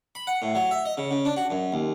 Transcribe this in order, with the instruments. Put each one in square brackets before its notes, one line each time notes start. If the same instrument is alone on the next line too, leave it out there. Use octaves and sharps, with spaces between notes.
[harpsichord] B5
F#5
A2
F#3
E5
D#5
C#3
C#3
D4
F#4
F#2
D#2